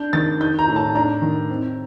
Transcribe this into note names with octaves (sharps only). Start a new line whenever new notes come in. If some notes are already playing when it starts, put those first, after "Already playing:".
Already playing: D4 G6
D#3 A6
D#4 G6
A#5
A2
A5
D4 A#5
D#3
C4